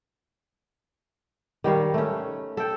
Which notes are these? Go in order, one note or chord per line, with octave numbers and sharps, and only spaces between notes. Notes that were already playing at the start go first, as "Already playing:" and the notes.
D#3 G3 C#5 F5
A3 C#4
A4 G5